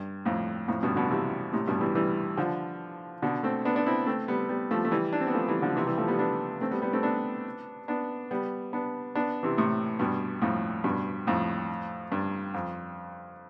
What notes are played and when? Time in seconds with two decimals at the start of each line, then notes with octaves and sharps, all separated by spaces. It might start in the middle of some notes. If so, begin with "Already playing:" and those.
Already playing: G2
0.26 F2 A2
0.68 F2 A2
0.83 G2 B2
0.96 B2 D3
1.11 C3 E3
1.53 A2 C3
1.68 G2 B2
1.81 E3 G3
1.95 E3 G3
2.37 D3 F3
3.22 B2 D3
3.43 A3 C4
3.65 B3 D4
3.75 B3 D4
3.86 C4 E4
4.07 A3 C4
4.28 G3 B3
4.49 G3 B3
4.71 F3 A3
4.85 A3
4.91 E3 G3
5.13 D4
5.20 C4
5.27 B3
5.34 F3 A3
5.48 E3 G3
5.62 D3 F3
5.76 C3 E3
5.87 E3 G3
5.98 F3 A3
6.08 G3 B3
6.18 B3 D4
6.61 A3 C4
6.71 G3 B3
6.82 G3 B3
6.93 A3 C4
7.03 B3 D4
7.88 B3 D4
8.31 G3 B3
8.73 B3 D4
9.15 B3 D4
9.43 C3 E3
9.57 A2 C3
9.99 G2 B2
10.42 F2 A2
10.84 G2 B2
11.27 F2 A2
12.12 G2
12.54 F2